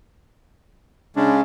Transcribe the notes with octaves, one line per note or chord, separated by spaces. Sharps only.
C#3 G#3 C#4 D4